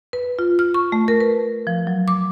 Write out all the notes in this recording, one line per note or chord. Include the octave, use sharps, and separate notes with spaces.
B4
F4
F6
C#6
A3
A#4
B4
F3
F#3
D6